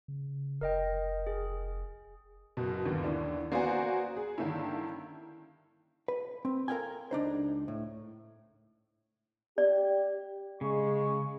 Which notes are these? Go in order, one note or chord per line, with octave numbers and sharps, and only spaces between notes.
C#3
F1 A#4 D#5 G5
G#4
F#1 B2
G1 D#2 B3
D#2 D3 E3 D4
A#3 B3 F#4 C5 D5 G#5
G#4
G2 D3 D#3 A#3 C#4 E4
B4
C4
A4 A#4 D#5 F5 G5 G#5
C#2 D4 D#4 C5
A2
G4 D5
C#3 G#3 C#6